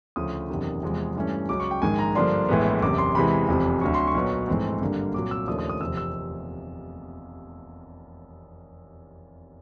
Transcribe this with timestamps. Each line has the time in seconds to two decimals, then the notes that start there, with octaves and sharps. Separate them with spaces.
0.16 D2 C#3 F3 D#6
0.50 F#1 E2 C3 D#3
0.83 E2 C3 F3 G#3
1.15 G2 E3 A3 C#4
1.49 C#2 C#3 F#3 D6
1.60 C#6
1.71 G5
1.82 A#1 G#2 D#3 G#3 G#5
1.99 A#5
2.15 G2 D3 F3 A#3 D4 C6
2.48 A#1 A2 E3 G#3 B3
2.82 F#1 E2 C3 D6
2.98 C6
3.15 E2 C3 E3 G#3 B5
3.48 F1 E2 C3 F3
3.81 D2 D3 F#3 C#6
3.94 C6
4.07 C#6
4.15 B1 A#2 F#3 B3
4.48 A#1 G#2 E3 A3 C4
4.81 G#1 G2 D3 G3 A#3
5.14 C2 A#2 F#3 D6
5.31 E6
5.47 D#2 C#3 F3 A3 D4 D#6
5.59 D#6
5.69 D#6
5.81 F1 E2 C3 F3 E6
5.97 E6